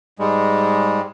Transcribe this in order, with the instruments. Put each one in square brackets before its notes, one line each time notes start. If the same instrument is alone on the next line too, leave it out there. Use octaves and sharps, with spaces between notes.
[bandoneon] G#2 G3 G#3